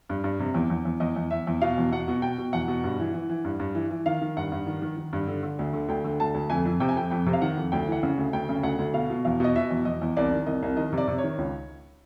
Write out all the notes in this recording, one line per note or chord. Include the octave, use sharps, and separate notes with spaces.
G2
G2
C3
E2
E2
E2
E2 D#5
E2
E2 E5
E2
B2 F5
E2
B2 F#5
B2
B2 G5
B2
E2 F#5
B2
G2
E3
E3
E3
G2
G2
E3
E3
D#3 F5
D#3
G2 F#5
G2
D#3
D#3
D#3
G2
D3
D3
D2
D3
D2 G5
D3
D2 A5
D2
F2 G#5
F2
C3 G5
G#5
F2 G5
F2 G5
C3
F5
D#3 F#5
F2
D2 G5
E3 F#5
C#3
D2
D2 G5
C#3
D2 F#5
D2
B2 F5
B2
E2 F5
B2 D#5
B2 E5
E2
E2 D#5
E2
C2 D5
D#3
C2 D#5
C2
D#3 D#5
C3
D5
C3
C#5
D#3
C#2